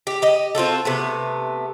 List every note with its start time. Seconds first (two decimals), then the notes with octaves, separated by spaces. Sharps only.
0.07 G4
0.22 G4 D#5
0.55 C4 F4 F#4 A4
0.85 C3 A3 B3